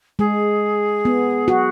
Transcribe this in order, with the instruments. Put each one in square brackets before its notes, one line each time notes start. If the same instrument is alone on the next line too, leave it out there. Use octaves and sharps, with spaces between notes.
[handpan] G#3 [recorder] G#4
[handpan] B3
F#4